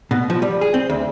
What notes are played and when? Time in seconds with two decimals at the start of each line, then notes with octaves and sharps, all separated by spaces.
0.11 B2
0.30 F3
0.42 G3
0.61 G#4
0.74 C4
0.90 D2